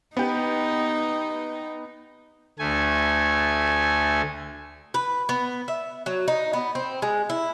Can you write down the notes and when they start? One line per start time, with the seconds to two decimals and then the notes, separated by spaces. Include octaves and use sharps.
0.17 B3 D#4 G4
2.59 D2 A3 G#5
4.94 B4
5.29 B3
5.68 E5
6.06 F#3
6.28 D#4
6.53 B3
6.75 C4
7.02 G#3
7.30 E4